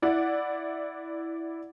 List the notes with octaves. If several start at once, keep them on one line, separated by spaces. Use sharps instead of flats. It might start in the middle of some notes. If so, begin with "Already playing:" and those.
E4 D5 F#5